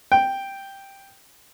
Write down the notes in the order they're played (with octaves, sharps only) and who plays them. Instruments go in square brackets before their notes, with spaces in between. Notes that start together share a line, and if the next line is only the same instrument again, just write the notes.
[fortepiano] G5